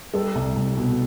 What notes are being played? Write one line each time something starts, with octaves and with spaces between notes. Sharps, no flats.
G3 A4
C2
C2
B2